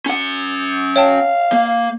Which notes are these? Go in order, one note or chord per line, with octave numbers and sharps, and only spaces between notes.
C#4 F#5
C#5 F5 G5 A5
A#3